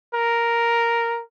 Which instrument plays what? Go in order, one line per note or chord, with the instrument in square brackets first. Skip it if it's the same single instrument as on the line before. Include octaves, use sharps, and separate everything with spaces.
[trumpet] A#4